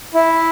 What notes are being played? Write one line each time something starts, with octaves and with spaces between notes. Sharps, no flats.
E4